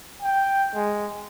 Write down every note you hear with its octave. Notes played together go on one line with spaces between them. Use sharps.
G5
G#3